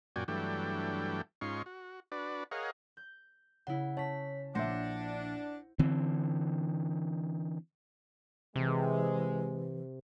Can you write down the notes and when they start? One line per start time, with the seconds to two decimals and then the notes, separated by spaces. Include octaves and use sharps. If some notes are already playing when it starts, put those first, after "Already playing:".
0.16 F#2 A#2 F#4 D5 G5 G#5
0.28 G2 E3 F#3 A3 D4 G5
1.41 G#2 C#4 D#4 F4 C6 C#6
1.66 F#4
2.12 D4 F#4 B4 D5
2.51 G#4 A#4 C#5 D#5 F5 F#5
2.97 G6
3.67 C#3 E4 F#5
3.97 C#4 C#5 A5 B6
4.55 A#1 D4 C5 E5 F#5 G6 A#6 C#7
5.79 D3 E3 C4
8.56 C3 E3 G#3